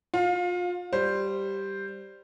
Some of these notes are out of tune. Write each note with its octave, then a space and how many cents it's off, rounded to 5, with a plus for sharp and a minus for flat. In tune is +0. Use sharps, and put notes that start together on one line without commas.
F4 +30 F5 +15
G3 +0 C5 +0